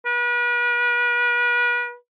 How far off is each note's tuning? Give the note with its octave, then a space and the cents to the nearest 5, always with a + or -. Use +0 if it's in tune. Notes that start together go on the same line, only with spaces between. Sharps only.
B4 -40